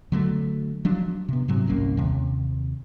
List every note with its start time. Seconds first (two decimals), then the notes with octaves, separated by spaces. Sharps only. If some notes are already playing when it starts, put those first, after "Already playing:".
0.12 D3 F#3 G#3 A3
0.85 F3 F#3 D4
1.29 C3 B3
1.48 G#2 C3 F#3 C4
1.68 G1 C2 A#3 C#4
1.97 D#2 C3